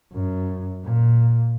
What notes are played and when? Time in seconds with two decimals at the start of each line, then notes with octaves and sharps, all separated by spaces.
0.14 F#2
0.84 A#2